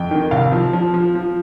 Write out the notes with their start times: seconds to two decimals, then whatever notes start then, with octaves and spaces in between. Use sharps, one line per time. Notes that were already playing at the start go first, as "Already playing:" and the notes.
Already playing: F2 G5
0.11 D#3
0.31 C2 F5
0.52 F3
0.73 F3
0.94 F3
1.15 F3